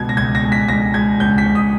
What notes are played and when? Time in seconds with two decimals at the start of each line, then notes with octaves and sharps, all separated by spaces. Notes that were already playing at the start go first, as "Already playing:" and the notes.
Already playing: C#2 B2 G#6
0.09 A#6
0.17 C#2 G#6
0.35 A#6
0.43 G#3
0.52 B6
0.68 C#2 A#6
0.94 G#3 G#6
1.20 C#2 G6
1.38 B6
1.46 C#2
1.55 D#6